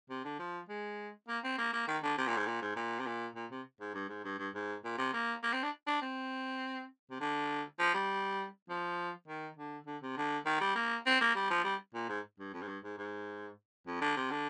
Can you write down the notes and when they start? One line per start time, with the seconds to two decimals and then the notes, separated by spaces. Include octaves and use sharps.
0.10 C3
0.24 D3
0.39 F3
0.69 G#3
1.28 A#3
1.44 C4
1.58 A#3
1.73 A#3
1.87 D#3
2.03 D3
2.18 C3
2.27 A#2
2.37 G#2
2.47 A#2
2.62 G#2
2.76 A#2
2.99 C3
3.06 A#2
3.35 A#2
3.51 C3
3.81 G#2
3.94 G2
4.09 G#2
4.24 G2
4.39 G2
4.55 G#2
4.84 A#2
4.98 C3
5.13 A#3
5.43 A#3
5.53 C4
5.63 D4
5.87 D4
6.02 C4
7.11 C3
7.20 D3
7.79 F3
7.94 G3
8.69 F3
9.27 D#3
9.57 D3
9.87 D3
10.02 C3
10.17 D3
10.46 D#3
10.61 G3
10.75 A#3
11.06 C4
11.21 A#3
11.35 G3
11.50 F3
11.64 G3
11.94 A#2
12.09 G#2
12.39 G2
12.53 F2
12.62 G#2
12.68 G2
12.84 G#2
12.98 G#2
13.86 F2
14.01 D3
14.17 C3
14.31 D3